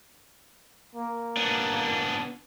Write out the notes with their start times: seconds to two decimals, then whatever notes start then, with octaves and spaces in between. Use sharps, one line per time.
0.95 A#3
1.37 B3 D4